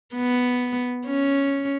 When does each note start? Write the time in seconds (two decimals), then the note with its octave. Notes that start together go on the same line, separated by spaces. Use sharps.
0.15 B3
1.06 C#4